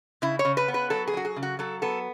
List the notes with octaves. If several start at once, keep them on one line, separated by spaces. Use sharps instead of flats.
C#3 E4
C#5
C#3
B4
B3
B4
F#3 A4
G#4
F#3 F#4
G#4
C#3
F#4
F#3 A4
B3 A4